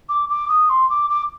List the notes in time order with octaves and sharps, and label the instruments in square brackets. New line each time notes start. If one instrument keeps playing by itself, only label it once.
[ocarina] D6
D6
D#6
C6
D6
D6